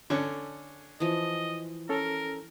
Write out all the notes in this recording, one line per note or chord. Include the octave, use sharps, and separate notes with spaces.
D3 C#4 A4 C#6
E3 F3 D#5
C#4 A4 A#4